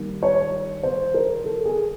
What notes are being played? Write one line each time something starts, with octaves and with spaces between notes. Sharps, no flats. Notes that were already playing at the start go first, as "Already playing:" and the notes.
Already playing: D#3 G3 A#3
C#5
C5
A#4
A4
G#4